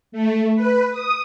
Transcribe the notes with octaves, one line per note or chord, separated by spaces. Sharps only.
A3
B4
D#6